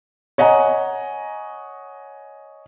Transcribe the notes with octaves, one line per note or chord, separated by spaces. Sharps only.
C#5 D#5 F#5 G#5 A#5